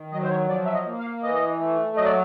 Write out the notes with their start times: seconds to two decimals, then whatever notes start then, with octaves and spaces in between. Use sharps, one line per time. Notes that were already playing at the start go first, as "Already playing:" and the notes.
Already playing: D#3
0.12 F#3 D#5
0.23 C5
0.30 C#5
0.48 F3 D5
0.66 E5
0.73 D#5
0.86 A#3
0.99 F5
1.23 E3 D#5
1.60 A3
1.97 F#3 D#5
2.04 D5